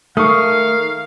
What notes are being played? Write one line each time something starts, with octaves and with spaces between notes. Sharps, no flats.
D#3 A3 F5 C#6 D#6